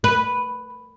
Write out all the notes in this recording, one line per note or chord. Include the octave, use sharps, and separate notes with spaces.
B4